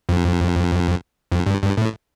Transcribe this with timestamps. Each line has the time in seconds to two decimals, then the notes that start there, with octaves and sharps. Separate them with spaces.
0.09 F2
1.32 F2
1.46 G2
1.62 G2
1.77 A2